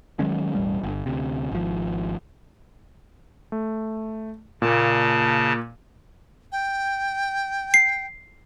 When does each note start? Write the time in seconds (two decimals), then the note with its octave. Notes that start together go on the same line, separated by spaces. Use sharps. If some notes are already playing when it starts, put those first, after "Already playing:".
0.19 D#3 F#3 G#3 C#4
0.55 E1 A1 G3
0.83 G1
1.06 D2 C3
1.52 G#1 F3
3.52 A3
4.62 A#2 C#3 A#3 A5
6.52 G5
7.74 C7